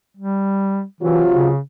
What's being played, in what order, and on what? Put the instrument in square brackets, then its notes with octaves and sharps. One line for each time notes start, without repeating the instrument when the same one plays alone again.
[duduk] G3
[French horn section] C3 F#3 F4 [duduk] E3
[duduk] C#3